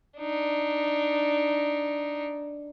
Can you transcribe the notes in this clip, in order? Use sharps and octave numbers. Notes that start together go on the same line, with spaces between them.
D4 D#4